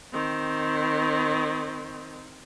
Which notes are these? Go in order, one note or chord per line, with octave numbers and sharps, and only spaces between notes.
D#3 C4